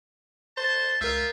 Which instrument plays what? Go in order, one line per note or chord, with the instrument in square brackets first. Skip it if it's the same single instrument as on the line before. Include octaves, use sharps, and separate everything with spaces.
[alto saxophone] C5 [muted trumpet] A5
[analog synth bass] C#2 [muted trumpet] F4 [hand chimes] A#4 G6 [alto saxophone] E5